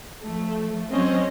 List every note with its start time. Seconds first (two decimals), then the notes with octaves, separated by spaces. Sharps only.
0.24 F3 A3
0.91 F#3 C4 C#4 C5 D#5